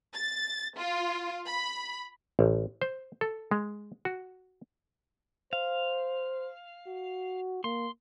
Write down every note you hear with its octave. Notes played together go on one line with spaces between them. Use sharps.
A6
F4
B5
A1
C5
A4
G#3
F#4
C5 F5
F#4
A#3 C6